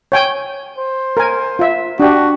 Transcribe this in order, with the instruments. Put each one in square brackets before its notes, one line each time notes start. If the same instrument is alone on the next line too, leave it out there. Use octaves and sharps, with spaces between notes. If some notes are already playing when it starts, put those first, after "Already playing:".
[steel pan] C#5 G5 G#5
[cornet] C5
[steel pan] A#4 G#5
F4 E5
[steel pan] D4 G4 [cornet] F#4